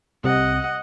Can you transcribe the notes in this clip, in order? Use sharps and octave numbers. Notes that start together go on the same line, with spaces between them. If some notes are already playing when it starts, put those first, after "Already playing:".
C2 C3 D#5 F#5